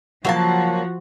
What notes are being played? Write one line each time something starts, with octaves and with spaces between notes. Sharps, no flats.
C#3 F3 F#3 A#3 F#4 A4 E5 A5